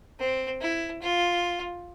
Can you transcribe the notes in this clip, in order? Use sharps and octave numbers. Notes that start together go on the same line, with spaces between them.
C4
E4
F4